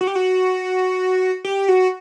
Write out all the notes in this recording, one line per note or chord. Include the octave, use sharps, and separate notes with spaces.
F#4
G4
F#4
G4
F#4